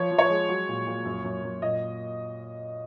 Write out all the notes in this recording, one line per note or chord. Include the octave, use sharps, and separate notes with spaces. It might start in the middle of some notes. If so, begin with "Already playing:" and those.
Already playing: F3 C#5
F3
C#5
G#3
F#3
A#2
A#2
F#2
F#2
F#2
A#2 D#5